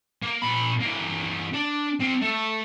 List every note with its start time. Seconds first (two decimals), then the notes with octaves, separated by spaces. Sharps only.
0.23 A#3
0.42 A#2 B5
0.81 E3 A#3
1.54 D4
2.00 C4 F5
2.21 A3